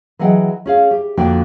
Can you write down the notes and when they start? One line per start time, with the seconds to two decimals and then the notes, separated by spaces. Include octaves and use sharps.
0.19 E3 F#3 G#4 D#5 F#5 G5
0.66 C#4 G#4 F5
0.91 G4
1.17 F2 D3 A#3 D4 F#4 G5